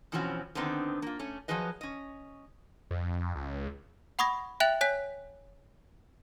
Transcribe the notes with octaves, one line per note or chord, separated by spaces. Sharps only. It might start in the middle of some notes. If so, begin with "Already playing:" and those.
B2 E3 F3 C4 C#4 F#4
D3 D#3 B3 C4 D#4
A#3 F4
A3 C#4
F3 F#3 G#3 G#4 B4 D#5
C#4 D#5
F2
C#2
F#5 B5 C#6 D#6 G#6 A#6
E5 G5 F#6 A6 F7 F#7
C#5 G#5 F#6 B6